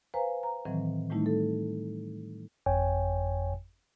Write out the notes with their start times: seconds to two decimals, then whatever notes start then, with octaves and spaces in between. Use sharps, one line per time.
0.14 B4 C5 F5 G#5 A#5
0.43 A#5
0.65 A2 D#3 E3 F#3 C4
1.10 A2 D#3 G3 A3 D#4 E4
1.26 A4
2.66 G1 F2 C#5 G5 G#5